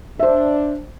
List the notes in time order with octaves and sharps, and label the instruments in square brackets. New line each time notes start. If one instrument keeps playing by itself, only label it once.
[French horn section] D4 [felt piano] C5 E5